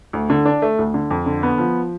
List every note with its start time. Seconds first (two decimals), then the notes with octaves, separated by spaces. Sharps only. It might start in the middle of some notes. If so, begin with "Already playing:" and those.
0.13 D2
0.30 D3
0.45 D4
0.62 A3
0.79 D2
0.94 D3
1.11 F2
1.26 D3
1.43 B3
1.58 F3